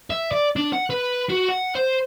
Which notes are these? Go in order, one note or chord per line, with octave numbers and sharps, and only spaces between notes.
E5
D5
D4
F#5
B4
F#4
F#5
C5